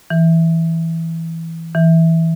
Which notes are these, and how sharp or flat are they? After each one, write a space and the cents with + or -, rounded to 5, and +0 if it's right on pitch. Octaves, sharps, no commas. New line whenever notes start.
E3 -5
E3 -10